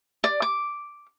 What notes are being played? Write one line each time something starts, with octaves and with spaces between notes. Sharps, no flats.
D5
D6